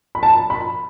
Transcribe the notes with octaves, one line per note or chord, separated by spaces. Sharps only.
B5
A5
B5